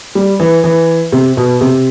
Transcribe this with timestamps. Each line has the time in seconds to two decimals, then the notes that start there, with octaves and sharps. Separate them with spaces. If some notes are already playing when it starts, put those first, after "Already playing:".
0.15 G3
0.40 E3
0.64 E3
1.12 C3
1.37 B2
1.61 C3